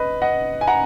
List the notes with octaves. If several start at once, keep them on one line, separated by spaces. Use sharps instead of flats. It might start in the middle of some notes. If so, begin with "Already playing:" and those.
Already playing: B4 D#5
D#5 F#5
G#5
F#5 A#5